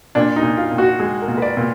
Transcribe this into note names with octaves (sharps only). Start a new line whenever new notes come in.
A#2 D4
D#4
A#2
F4
A#2
F#4
G#3 G#4
A#4
A#2
B4
D5
A#2